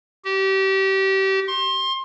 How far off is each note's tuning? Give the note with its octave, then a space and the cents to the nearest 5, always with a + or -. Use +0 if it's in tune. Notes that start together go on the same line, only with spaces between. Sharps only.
G4 -30
C6 +25